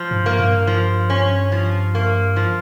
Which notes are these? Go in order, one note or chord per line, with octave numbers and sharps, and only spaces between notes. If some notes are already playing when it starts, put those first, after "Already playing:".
Already playing: F3
G2
A#3
G2
F3
C#4
F3
A#3
F3